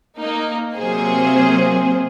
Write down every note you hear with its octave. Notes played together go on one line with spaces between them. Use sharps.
A#3 D#4
C3 F#3 A#3 G#4 C5